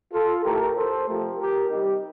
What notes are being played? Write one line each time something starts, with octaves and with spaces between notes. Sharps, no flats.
F4 A4
A2 A3 G4 A#4
A4 C5
C3 F3 A3 G4 A#4
G4 A#4
C3 G3 D#4 G4